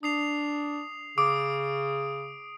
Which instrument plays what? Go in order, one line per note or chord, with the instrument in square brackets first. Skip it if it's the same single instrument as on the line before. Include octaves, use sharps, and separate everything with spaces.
[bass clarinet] D4 [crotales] D#6 C7 F7
[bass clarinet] C#3 [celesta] D6 [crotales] D#6 D7